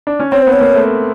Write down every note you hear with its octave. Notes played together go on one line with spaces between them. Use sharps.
D4
C#4
C4 C#5
B3 C5
C#5
A#3
A3